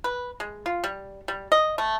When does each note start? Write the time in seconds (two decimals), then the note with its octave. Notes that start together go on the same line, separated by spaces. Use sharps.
0.04 B4
0.40 G#3
0.66 F4
0.84 G3
1.28 G3
1.52 D#5
1.78 A3